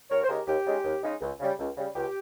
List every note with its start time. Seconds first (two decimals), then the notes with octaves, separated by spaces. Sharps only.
0.10 D#2 A#4 C#5
0.24 C5
0.28 C#3 G#3 D#4 G4 A#4
0.47 D#2 G4
0.66 C#3 G#3 D#4
0.84 D#2
1.03 C#3 G#3 D#4
1.21 C#2
1.40 C#3 G3
1.59 C#2
1.77 C#3 G3
1.95 C#2 G4